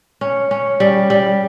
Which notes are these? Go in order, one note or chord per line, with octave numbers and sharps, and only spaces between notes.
C#4
C#4
G3
G3